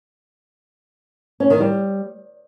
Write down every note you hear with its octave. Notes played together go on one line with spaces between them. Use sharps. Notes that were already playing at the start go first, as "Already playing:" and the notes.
C#4
D#3
G3